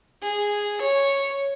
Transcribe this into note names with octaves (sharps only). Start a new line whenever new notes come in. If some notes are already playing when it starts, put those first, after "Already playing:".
G#4
C#5